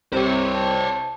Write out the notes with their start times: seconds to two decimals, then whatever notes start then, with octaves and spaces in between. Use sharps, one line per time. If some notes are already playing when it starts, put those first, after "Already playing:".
0.12 C2 C3 C5 C#5
0.54 A5